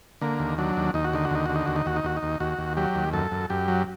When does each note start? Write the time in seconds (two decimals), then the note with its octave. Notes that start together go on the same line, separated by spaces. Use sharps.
0.21 D3 A#3
0.40 D#2
0.58 F#3 D4
0.77 D#2
0.94 D#2 D#4
1.05 F#4
1.13 D3 D#4
1.25 F#4
1.31 D#2 D#4
1.46 D3 F#4
1.56 D#4
1.66 D#2 F#4
1.76 D#4
1.86 D#2 F#4
1.96 D#4
2.04 D#2 F#4
2.17 D#4
2.23 D#2
2.40 D#2 F#4
2.59 D#2
2.77 F#3 G4
2.95 D#2
3.13 F#2 A4
3.31 F#2
3.50 F#2 G4
3.68 F#3